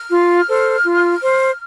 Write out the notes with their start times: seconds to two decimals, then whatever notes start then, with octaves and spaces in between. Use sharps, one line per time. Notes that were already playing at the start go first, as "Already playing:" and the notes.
Already playing: F6
0.10 F4
0.47 A4 C5
0.84 F4
1.22 C5